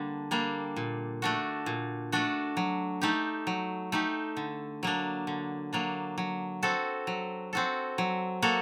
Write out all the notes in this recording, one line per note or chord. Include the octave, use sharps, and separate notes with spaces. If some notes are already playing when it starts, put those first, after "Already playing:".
Already playing: D3 G3 A#3 D4
G3 A#3 D4
A#2
A3 D4 F#4
A#2
A3 D4 F#4
F#3
A3 D#4 G4
F#3
A3 D#4 G4
D3
F#3 A#3 D4
D3
F#3 A#3 D4
F#3
C4 F#4 A4
F#3
C4 F#4 A4
F#3
A#3 F#4 A4